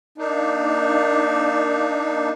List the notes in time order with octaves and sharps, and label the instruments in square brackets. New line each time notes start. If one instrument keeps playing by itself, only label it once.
[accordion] A#3 D4 D#4